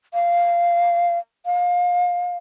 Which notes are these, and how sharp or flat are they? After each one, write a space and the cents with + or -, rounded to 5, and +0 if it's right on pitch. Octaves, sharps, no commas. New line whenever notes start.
F5 -10
F5 +25